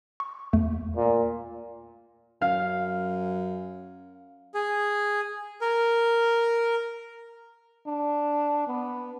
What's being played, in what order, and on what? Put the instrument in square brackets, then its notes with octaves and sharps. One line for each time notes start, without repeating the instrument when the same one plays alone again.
[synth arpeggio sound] C#6
E2 A3
[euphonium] A#2
[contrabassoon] F#2 [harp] F5
[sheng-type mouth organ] G#4
A#4
[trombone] D4
B3